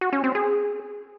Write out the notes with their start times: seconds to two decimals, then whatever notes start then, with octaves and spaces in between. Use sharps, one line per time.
0.01 F#4
0.13 C#4
0.24 C4
0.35 G#4